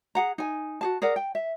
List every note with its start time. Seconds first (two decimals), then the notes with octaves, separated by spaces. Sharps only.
0.15 G#4 F#5 A#5
0.38 D#4 G#5
0.81 F#4 G#4 A5
1.02 G#4 A#4 D5 F#5
1.16 G5
1.35 E5